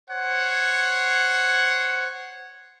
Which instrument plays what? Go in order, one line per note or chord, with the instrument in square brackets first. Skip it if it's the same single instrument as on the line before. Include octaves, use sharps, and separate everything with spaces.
[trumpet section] C5 C#5 F#5